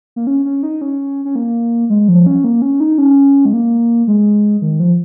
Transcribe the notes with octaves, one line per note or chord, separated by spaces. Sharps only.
A#3
C#4
C#4
D#4
C#4
C#4
A#3
G#3
F3
C#4
A#3
C#4
D#4
C#4
G#3
A#3
G#3
D#3
F3